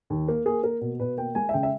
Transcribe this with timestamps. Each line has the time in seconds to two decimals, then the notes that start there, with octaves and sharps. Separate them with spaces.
0.10 D#2
0.28 A#3
0.46 A#3 G#4
0.64 A#3 A#4
0.81 B2
1.00 B2 B4
1.18 A#3 G5
1.35 G#3 G#5
1.49 E5
1.54 C#3 G5
1.63 E5